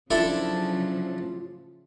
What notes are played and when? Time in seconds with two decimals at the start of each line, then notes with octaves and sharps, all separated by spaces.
0.11 C#3 F3 F#3 D4 E4 F4 A4